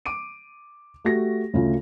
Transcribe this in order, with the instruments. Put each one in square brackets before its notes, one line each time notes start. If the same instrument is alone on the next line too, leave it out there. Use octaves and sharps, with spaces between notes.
[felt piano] D6 D7 D#7
A3 F#4 G4 A#6
D2 C#3 A3 F4